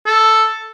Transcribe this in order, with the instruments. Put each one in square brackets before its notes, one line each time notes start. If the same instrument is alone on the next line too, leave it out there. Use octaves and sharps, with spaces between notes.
[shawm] A4